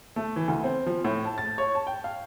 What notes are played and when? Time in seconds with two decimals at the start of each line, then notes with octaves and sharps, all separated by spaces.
0.16 A3
0.36 E3
0.48 D2
0.64 C4
0.86 F3
1.04 A2
1.25 A5
1.38 A6
1.58 C#5
1.75 A5
1.87 G5
2.04 F5